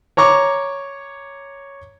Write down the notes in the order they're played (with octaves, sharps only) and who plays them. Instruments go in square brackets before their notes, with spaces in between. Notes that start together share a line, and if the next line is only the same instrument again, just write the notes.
[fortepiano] C#5 A#5 C#6 D6